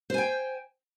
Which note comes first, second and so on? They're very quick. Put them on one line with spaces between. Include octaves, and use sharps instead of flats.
C5 G#5 G5